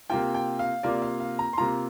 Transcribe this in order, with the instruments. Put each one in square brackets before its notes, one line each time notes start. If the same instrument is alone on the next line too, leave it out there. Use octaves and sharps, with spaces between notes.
[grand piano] C3 A#3 F4 G5
G5
F5
C3 A#3 F4 D5
F5
F5
A#5
C6
C3 A#3 F4 A#5